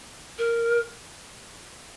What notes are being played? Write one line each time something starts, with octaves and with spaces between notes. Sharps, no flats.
A#4